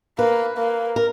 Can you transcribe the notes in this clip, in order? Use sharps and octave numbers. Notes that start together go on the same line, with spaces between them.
A#3 B4
A#3
A#4